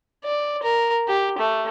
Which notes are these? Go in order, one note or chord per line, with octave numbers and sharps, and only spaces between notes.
D5
A#4
G4
A3